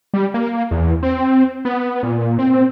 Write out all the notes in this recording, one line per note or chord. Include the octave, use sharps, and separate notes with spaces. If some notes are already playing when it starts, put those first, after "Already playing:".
G3
A#3
E2
C4
B3
A#2
C4